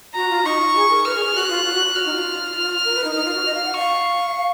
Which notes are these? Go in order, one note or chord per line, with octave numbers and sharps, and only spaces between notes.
F#4 A#5
F4
D#4 C#6
F4
G#4
A#4
B4 F6
G#4
G#4
F#4 F#6
F4
F4
F#4
F#4 F6
D#4
F4
F6
A#4
B4
D#4
D#4 F6
F4
F#4
D#5
F5
F#5
F5 C#6